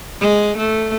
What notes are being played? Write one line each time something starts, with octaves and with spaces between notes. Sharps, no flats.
G#3
A3